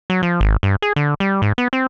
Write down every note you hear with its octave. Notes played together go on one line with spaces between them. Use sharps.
F#3
F3
G#1
G2
G#4
D3
G3
G#2
B3
C4